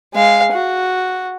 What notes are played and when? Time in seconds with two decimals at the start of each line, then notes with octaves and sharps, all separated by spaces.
0.14 G#3 F5
0.52 F#4